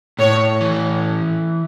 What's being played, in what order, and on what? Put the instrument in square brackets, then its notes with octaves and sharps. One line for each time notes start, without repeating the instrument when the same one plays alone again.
[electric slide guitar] A2 [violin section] C#5
[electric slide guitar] E3